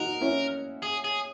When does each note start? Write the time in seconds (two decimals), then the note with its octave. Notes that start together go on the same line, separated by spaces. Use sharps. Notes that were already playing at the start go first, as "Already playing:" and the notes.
Already playing: D#4 F#4 A#4
0.21 C#4 E4
0.82 G#4
1.04 G#4